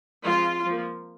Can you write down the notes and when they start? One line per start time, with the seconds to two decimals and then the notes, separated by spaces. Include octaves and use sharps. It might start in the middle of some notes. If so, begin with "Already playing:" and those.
0.24 F3 G#3 C4 F4
0.66 F3 A#3